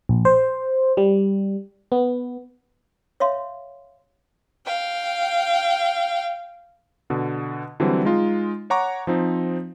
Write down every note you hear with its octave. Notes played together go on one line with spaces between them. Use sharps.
A#1
C5
G3
B3
C#5 E5 F5 C6
F5 G5
B2 D3
D3 E3 F#3 G3 C4
G#3 D#4 F4
C#5 F#5 A#5 C#6 D6
F3 C4 D#4